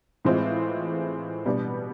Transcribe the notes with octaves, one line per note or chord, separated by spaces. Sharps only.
A2 E3 G#3 C4 F4
B2 G3 B3 D4